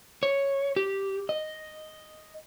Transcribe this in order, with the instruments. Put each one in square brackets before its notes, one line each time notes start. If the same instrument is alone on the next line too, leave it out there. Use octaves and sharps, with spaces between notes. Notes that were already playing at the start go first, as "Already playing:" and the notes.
[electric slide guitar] C#5
G4
D#5